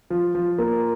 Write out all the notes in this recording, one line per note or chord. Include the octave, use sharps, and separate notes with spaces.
F3
F3
A#3